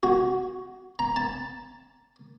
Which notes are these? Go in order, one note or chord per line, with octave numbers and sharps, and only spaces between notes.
F#4
A#5
A5